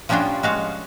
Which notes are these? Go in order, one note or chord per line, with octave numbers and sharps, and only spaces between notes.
F3 G3 C#4 D4 F4 F#4
G#3 F#4 F5